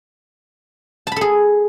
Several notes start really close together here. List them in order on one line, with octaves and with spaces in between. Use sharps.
A5 B5 A4 G#4